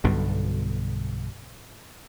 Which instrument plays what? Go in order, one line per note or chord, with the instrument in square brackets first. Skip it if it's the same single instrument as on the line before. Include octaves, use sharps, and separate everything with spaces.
[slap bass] B1 G2 B2 D3